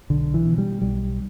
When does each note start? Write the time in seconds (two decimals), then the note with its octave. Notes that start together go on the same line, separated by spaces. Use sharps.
0.10 B1 D3
0.34 E3
0.46 B2
0.58 G3
0.82 B1 G3